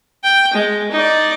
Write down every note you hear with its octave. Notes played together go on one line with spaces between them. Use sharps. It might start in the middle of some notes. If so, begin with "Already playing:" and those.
G5
G#3
D#4 D5